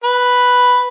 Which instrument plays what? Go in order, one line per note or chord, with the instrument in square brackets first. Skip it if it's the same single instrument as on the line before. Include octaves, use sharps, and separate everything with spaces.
[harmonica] B4